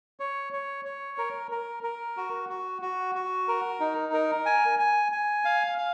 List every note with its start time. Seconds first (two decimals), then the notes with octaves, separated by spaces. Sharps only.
0.20 C#5
0.53 C#5
0.85 C#5
1.18 A#4
1.51 A#4
1.83 A#4
2.17 F#4
2.49 F#4
2.82 F#4
3.15 F#4
3.48 A#4
3.80 D#4
4.13 A#4
4.46 G#5
4.79 G#5
5.12 G#5
5.45 F5
5.78 F5